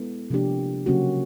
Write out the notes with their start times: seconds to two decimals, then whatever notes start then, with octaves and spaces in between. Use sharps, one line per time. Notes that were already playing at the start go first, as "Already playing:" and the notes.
Already playing: G#3 B3 E4 A4
0.30 C3 F3 A#3 D4 G4
0.86 C#3 F#3 A#3 C#4 F#4